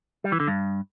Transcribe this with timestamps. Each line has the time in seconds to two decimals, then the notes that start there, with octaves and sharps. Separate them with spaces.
0.24 G3
0.32 E3
0.40 D3
0.48 G2